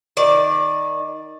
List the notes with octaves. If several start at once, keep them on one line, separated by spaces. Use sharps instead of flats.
D#3 D5